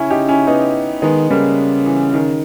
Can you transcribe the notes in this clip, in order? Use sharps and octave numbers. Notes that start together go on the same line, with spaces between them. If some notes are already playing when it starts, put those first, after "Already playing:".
Already playing: C#3 C#4 E4
D#4 G4
C#4 E4
B3 D#4
D#3 G#3 B3
C#3 G3 A#3
E3
D#3